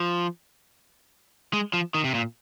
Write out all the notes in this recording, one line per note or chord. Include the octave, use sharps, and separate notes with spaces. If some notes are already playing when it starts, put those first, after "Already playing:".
Already playing: F3
G#3
F3
D#3
C3
A#2